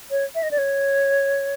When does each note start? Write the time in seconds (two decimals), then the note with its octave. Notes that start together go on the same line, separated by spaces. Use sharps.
0.11 C#5
0.35 E5
0.43 D#5
0.51 D5
0.58 C#5